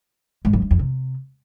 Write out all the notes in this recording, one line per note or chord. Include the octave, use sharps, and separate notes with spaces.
G#2
F#2
G2
F2
C3